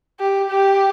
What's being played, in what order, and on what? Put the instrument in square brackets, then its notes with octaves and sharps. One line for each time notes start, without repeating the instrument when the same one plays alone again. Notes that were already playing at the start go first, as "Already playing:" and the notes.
[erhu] G4
G4